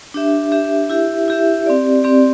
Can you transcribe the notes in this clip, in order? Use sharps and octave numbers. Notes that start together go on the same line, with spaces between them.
D4 G4 E5
D4 G4 E5
E4 G4 E5
E4 G4 E5
C4 G4 D5
C4 G4 D5